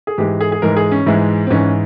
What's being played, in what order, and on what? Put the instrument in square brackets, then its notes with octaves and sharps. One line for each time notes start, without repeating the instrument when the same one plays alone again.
[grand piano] G#4
G#2 E3 G#3 G4
G#4
G#4
G#2 E3 G#3 A#4
G#4
C#4
G#2 E3 G#3 E4
C4
G#2 E3 G#3 C#4